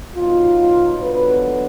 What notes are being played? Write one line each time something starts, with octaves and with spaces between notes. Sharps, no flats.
B2 F#3 B3 D#4 F4
D3 F#3 B3 B4